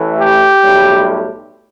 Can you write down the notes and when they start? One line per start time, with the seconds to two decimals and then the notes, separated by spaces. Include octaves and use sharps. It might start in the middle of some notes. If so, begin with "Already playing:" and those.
Already playing: A1 A2 E3 A3
0.20 G4
0.62 B1 A2 G3